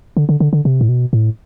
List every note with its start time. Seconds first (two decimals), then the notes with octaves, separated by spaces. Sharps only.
0.17 D3
0.29 D3
0.40 D3
0.53 D3
0.65 C3
0.81 A2
0.89 B2
1.13 A2